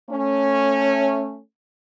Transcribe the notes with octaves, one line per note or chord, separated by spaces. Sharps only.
A3 C#4